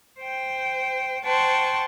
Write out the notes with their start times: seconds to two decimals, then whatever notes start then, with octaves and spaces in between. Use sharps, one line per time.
0.20 C5 G5
1.26 C5 F#5 G5 A5 C6 C#6